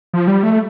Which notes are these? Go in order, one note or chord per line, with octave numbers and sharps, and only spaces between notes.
F3
G3
A3